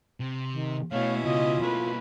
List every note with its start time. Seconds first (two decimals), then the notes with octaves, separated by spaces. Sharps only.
0.20 C3
0.53 D#3
0.92 B2 A3 C#4 E4 C#5 F5
1.25 C#2 F4 D#5
1.63 A3 A#3 B4